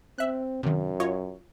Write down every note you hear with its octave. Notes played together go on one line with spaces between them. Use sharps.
C4 E5 F#6
F#2 C3 D#3
F4 C#5 D#5